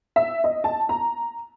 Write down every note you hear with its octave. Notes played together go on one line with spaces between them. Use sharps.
E5
D#5
A5
A#5